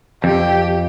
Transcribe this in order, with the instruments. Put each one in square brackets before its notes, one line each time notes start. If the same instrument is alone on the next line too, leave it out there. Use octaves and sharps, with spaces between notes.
[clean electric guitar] F2 [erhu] G4